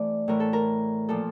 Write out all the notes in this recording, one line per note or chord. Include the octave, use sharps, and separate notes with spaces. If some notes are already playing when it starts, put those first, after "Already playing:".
Already playing: E3 A3 C4 D5
A2 E3 A3 A#4
A4
A#4
A#2 F3 A#3 A4